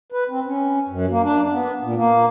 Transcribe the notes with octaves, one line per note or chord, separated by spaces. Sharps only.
B4
C4
C#4
F#2
A#3
D4
B3
A#2
A#3